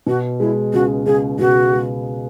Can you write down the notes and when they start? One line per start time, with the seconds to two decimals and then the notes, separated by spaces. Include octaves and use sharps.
0.07 B2 F#4
0.40 G#3 E4
0.73 C#2 F#4
1.06 C#2 G#4
1.39 B2 F#4
1.73 G#3